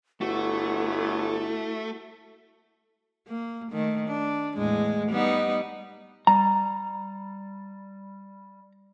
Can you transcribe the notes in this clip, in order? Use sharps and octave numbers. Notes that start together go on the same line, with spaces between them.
G1 A3 E4 F#4
A#3
D#3 A3
D4
E2 A2 G#3
G3 B3 D#4
G3 A#5